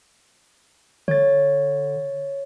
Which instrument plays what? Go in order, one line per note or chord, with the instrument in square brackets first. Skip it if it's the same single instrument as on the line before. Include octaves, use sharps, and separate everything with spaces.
[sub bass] D3 [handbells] C#5 A6